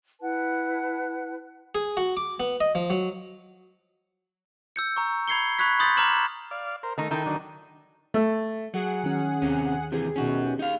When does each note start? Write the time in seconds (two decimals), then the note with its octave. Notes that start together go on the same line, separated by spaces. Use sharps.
0.21 E4 B4 F#5 A5
1.75 G#4
1.97 F#4
2.17 D6
2.40 B3
2.60 D#5
2.75 F3
2.90 F#3
4.76 E6 G6 C#7
4.96 A#5 C#6
5.28 B5 G#6 C7 C#7 G7
5.59 B5 C#6 F#6 G#6 B6
5.79 B5 C6 D#6 G6 A6 B6
5.97 A#5 D6 F6 E7 F#7
6.51 D5 F5
6.83 A#4 C5
6.98 D#3 A3 D#4
7.11 D#3 D#4 E4 A4 G5
7.26 D3 F#3 D4
8.14 A3
8.74 F#3 G#4 F#5
9.04 D#3 C#4
9.42 D#2 C3 C#4
9.92 C3 E3 G4 G#4
10.16 B2 D#3 C#4 F#4
10.59 D#4 F5